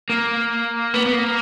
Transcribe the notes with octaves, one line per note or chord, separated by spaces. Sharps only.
A#3
B3
B3
A#3